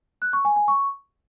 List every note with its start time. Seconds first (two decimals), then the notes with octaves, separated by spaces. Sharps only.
0.22 F#6
0.33 C#6
0.45 G#5
0.56 G#5
0.68 C#6